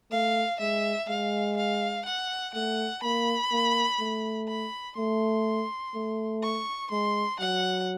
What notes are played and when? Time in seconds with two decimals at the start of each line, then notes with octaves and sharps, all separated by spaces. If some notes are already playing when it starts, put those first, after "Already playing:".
0.11 A3 F5
0.60 G#3 E5
1.09 G#3 F5
1.57 F5
2.06 F#5
2.54 A3 F#5
3.03 A#3 B5
3.52 A#3
4.00 A3
4.48 B5
4.97 A3 C6
5.95 A3
6.43 C#6
6.91 G#3 C6
7.40 F#3 F#5